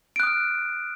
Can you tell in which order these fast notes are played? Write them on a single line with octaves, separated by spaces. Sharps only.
D7 F#6 D#6 F6